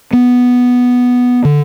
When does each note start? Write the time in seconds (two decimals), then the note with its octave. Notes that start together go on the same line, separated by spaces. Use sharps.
0.13 B3
1.45 D3